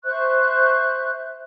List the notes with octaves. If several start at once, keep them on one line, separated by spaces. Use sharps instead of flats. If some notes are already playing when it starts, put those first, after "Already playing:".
C5 E5 C#6 F#6